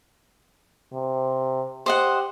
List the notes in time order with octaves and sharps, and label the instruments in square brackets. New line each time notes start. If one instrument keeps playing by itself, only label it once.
[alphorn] C3
[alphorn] G4 [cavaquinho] C5 D#5 F#5